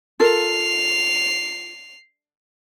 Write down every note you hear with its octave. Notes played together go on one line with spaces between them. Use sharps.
F4 A4 A#4 C7 F7